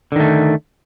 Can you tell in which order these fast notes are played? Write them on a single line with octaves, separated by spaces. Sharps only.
D3 D#3 A3